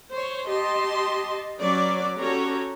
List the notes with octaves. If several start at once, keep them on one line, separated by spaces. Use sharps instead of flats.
C5 C#5
G4 D#5 A5 C6
F#3 C#4 B4 D5
C#4 F#4 G4 A4 C#5 A#5